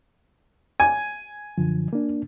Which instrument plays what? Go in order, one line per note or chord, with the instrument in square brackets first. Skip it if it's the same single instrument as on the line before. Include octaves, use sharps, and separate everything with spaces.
[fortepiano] G#5
[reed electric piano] F#2 D3 F3
A#3 D4